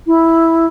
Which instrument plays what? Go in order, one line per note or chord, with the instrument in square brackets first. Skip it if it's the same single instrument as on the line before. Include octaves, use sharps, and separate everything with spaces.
[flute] E4